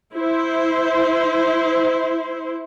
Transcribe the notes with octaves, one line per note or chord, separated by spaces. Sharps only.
E4 C5